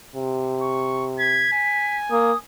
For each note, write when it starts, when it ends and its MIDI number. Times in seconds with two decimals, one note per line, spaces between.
0.15 1.52 48
0.62 1.06 85
1.19 1.49 92
1.19 1.98 95
1.53 2.40 80
2.11 2.32 58
2.11 2.37 87